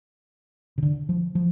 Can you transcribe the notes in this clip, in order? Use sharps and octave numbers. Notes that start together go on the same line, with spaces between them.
C#3
D3
F3
F3